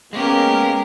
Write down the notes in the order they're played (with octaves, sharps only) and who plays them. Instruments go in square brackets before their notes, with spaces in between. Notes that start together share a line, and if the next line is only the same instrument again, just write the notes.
[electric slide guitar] G#3 [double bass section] A#3 [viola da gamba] B3 C#4 [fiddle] G4 A#4